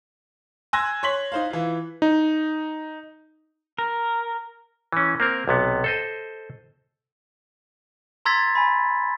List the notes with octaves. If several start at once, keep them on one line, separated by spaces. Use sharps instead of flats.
G#5 C6 E6 F#6 G#6 A#6
C#5 C6 B6 F#7
D#4 C5 F5
E3 F4
D#4
A#4
E3 C#4
A#3 C4 A#4
B1 C3 B3
A4 C5 D#5
A#5 C6 E6 G#6 A6 B6
G#5 B5